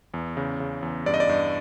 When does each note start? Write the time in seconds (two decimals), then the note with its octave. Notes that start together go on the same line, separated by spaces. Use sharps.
0.14 E2
0.37 C#3
0.60 C#3
0.83 E2
1.06 G2 D5
1.14 D#5
1.20 D5
1.29 G2